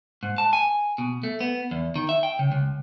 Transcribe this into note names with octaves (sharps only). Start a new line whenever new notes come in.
G#2
A5
G#5
B2
A3
B3
E2
D#3
E5
G5
C#3
C#2